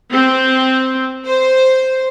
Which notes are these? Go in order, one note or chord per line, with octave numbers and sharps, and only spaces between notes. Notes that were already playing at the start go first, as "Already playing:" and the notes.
C4
C5